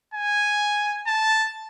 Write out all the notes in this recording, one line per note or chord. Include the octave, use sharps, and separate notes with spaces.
G#5
A5